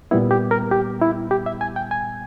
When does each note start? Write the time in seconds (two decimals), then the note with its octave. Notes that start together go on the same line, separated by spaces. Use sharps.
0.11 A#2 G3 B3 E4
0.31 G4
0.51 A#4
0.71 G4
1.01 E4
1.31 G4
1.46 E5
1.61 G#5
1.76 G5
1.91 G#5